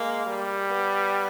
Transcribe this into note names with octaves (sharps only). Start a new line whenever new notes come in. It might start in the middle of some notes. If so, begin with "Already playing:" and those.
Already playing: G#3 A#3
G3
B3